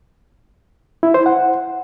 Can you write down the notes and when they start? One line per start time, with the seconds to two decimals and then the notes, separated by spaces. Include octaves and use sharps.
1.03 E4
1.14 C5
1.26 F#5